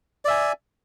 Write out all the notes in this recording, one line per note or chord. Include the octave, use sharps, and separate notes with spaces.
D5 E5 G#5